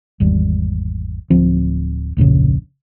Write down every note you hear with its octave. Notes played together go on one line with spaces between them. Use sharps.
G#1 E2 G3
D1 F3 C4
D1 A#1 F2 C#3